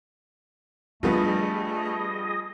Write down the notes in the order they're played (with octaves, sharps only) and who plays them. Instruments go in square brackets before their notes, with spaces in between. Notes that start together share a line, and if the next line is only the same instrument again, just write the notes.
[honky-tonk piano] F3 G3 B3 [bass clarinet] A3 [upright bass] D4 [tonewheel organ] G#4 D#5